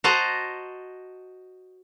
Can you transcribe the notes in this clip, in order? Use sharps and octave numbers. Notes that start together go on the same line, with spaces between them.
F#4 C5 D#5 A5 A#5